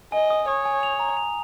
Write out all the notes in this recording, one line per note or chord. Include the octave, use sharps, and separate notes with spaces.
D#5 G#5
D#6
C#5 D#6
G#5
F7
A#5
F7